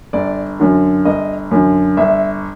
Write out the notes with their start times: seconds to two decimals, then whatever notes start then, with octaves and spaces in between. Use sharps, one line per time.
0.13 G1 D5
0.60 F#2 D3
1.05 G1 D#5
1.51 F#2 D3
1.97 G1 E5